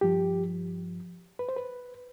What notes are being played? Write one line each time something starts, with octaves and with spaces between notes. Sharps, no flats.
G2 F3 G4
B4
C5
B4